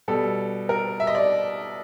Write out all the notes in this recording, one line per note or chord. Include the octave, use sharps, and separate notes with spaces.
B2 G3 A4
A#4
E5
D#5
D5